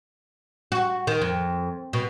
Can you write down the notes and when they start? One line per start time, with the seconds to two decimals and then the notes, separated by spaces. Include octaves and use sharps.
0.72 F#4
1.07 D#3
1.22 F2
1.93 B2